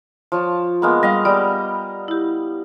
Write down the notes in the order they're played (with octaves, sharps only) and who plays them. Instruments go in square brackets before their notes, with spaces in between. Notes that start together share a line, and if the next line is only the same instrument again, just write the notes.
[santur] F3 C#5 A5
G#3 A#3 B3
[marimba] G3 [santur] D#5 F5
[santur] G3 B3 [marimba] D5
[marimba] E4 G4